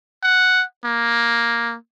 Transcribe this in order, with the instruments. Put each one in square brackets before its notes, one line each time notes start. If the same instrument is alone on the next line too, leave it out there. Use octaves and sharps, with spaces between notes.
[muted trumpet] F#5
A#3